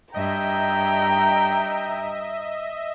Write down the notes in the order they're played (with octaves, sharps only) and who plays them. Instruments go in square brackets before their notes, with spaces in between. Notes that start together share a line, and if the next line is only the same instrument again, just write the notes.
[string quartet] G2 [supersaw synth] D#5 E5 [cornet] G5 [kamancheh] A#5